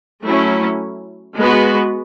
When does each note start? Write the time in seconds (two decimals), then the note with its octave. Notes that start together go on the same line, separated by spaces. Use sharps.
0.24 F#3 A3 C#4 E4
1.36 G#3 B3 F#4 B4